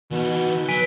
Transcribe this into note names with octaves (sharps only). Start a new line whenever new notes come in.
B2 E3 D#4
B4
F#3 G#5 B6 D7